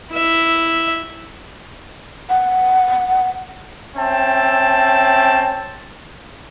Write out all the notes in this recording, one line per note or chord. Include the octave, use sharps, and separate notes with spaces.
E4 E5
F#5
C4 C#4 E5 G5 A5